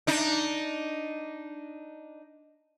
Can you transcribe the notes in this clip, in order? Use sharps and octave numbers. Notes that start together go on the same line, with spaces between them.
D4 D#4